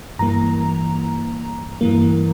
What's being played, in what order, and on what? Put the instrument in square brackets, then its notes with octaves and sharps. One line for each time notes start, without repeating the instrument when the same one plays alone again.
[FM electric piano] G2 E3 A#3 A#5
G2 E3 A#3